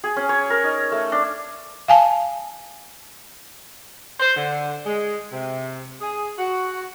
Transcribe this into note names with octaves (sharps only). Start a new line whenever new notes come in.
G#4
C#4
C#5
A#4
D#4
A3
D4
F5 G#5 A5
C5
D3
G#3
C3
G#4
F#4